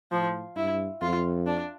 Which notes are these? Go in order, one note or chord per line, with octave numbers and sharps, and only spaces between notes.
A2 F3
G2 E4
F2 F4
D4